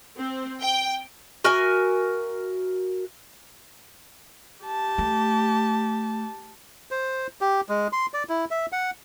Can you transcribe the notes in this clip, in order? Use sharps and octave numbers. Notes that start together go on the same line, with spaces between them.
C4
G5
F#4 A#4 E5 G#5
G4 A5
A3
C5
G4
G#3
C6
D5
E4
E5
F#5